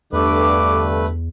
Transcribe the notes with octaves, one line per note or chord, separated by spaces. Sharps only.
E2 G2 D3 A3 B4 D6